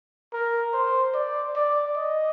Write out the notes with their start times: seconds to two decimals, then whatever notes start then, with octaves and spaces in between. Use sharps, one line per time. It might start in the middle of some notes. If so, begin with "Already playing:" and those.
0.33 A#4
0.73 C5
1.14 D5
1.56 D5
1.97 D#5